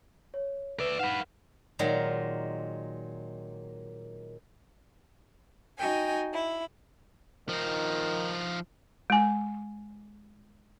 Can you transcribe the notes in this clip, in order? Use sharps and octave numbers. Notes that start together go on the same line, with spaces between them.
C#5
B4 D5 E5
D#4 B4 F5 F#5 E7
A#2 D#3 F#3 G#3 A#4 A#5
D#4 F#4 G5 G#5
E4
D#3 F3 D#4
G#3 G#5